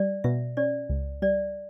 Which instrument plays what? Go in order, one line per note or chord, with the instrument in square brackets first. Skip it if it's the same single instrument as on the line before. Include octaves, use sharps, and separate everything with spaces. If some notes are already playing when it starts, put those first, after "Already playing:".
Already playing: [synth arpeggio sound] G3 [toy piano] D5
[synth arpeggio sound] B2 [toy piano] E5
[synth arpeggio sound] C#4 [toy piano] D5
[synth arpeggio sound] C#2
[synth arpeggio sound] G3 [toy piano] D5